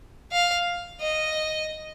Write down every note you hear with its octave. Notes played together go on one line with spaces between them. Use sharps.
F5
D#5